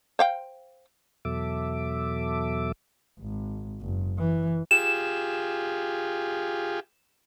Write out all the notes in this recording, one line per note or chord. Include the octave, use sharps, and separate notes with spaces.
C5 F5 G5
E2 B2 F#3 A4 E5 D6
G#1
F#1
E3
F4 G4 G#4 E7